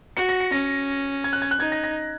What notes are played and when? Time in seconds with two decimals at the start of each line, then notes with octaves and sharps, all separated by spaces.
0.16 F#4 C#7
0.29 A#6
0.40 C#7
0.52 C#4 A#6
1.24 G#6
1.33 F#6
1.42 G#6
1.51 F#6
1.60 D#4 G#6
1.72 A#6
1.84 A#6